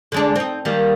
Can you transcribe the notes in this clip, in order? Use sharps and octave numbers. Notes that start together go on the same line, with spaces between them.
D3 G#3 D4
C4 D#4
D#3 G3 A#3